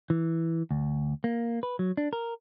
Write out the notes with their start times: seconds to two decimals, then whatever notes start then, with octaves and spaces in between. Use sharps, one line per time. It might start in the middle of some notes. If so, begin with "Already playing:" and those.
0.10 E3
0.71 D2
1.24 A#3
1.63 B4
1.79 F#3
1.97 D4
2.13 A#4